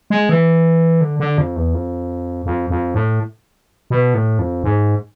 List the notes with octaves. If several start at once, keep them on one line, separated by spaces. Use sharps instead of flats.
G#3
E3
D3
D3
F2
E2
F2
F2
F2
A2
B2
A2
F2
G#2